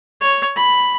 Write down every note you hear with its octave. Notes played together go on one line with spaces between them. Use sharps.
C#5
B5